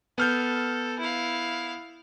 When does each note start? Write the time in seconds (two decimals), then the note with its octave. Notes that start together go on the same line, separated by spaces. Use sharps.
0.18 B3 A4 F6 G6
0.99 E4 F5